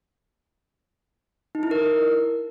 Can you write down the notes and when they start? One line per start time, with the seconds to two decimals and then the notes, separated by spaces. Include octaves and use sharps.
1.55 D#4
1.63 E4
1.71 A#4